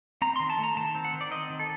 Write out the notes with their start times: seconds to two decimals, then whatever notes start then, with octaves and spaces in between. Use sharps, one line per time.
0.22 C4 A#5
0.36 D#3 C6
0.50 A5
0.59 A3 A#5
0.77 D#3 A5
0.95 C4
1.04 F#5
1.13 D#3
1.21 D5
1.31 C4 D#5
1.50 D#3
1.59 A4